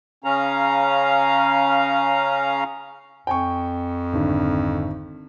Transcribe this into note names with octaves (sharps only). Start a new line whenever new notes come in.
C#3 C#4 F5 A#5
F2 G5 G#5 C#6
G#1 D3